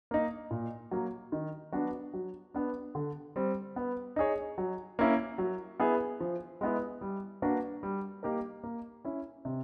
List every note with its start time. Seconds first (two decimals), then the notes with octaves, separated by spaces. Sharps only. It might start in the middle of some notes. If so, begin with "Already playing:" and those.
0.11 A#3 D#4
0.51 A#2
0.91 F#3 A#3
1.32 D#3
1.72 F#3 B3 D4 F#4
2.13 F#3
2.54 B3 D4
2.95 D3
3.36 G3 C4
3.76 B3
4.16 D#4 G#4 C#5
4.58 F#3
4.99 A#3 C#4 E4
5.38 F#3
5.80 B3 E4 G#4
6.20 F3
6.61 G#3 B3 E4
7.01 G3
7.42 A#3 D4 F#4 B4
7.83 G3
8.23 A#3 D#4 G4 A#4
8.64 A#3
9.05 C#4 E4
9.45 C3